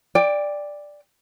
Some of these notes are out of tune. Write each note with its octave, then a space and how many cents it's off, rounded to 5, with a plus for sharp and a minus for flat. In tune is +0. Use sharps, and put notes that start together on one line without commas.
D5 +0 G5 +25